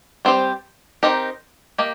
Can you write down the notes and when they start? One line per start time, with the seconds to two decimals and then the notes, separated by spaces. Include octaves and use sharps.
0.25 G3 C4 G4 C5
1.03 C4 D#4 G4 A#4 D#5
1.78 A#3 G4 D#5